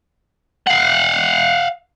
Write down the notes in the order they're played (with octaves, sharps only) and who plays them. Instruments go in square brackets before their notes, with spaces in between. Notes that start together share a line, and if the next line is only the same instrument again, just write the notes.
[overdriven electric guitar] F5 F#5